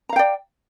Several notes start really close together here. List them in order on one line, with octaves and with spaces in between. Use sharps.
A#5 F5 G5 D5